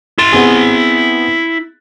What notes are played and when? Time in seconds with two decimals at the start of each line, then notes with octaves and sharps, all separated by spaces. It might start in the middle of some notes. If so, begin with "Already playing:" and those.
0.18 E4 C6 A6 D7 E7
0.32 B3 C4 G#4